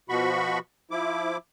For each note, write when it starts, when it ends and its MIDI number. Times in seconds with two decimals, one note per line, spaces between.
0.09 0.59 47
0.09 0.59 53
0.09 0.59 66
0.09 0.59 83
0.09 0.59 85
0.91 1.37 53
0.91 1.37 64
0.91 1.37 86